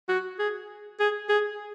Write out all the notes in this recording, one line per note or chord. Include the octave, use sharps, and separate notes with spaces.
F#4
G#4
G#4
G#4